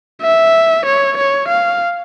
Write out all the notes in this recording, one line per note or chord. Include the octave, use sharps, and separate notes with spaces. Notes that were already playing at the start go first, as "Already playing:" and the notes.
E5
C#5
C#5
F5